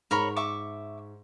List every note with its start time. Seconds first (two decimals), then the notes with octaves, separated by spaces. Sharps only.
0.11 G#2 A#4 C#5 B5
0.36 E5 C#6 D6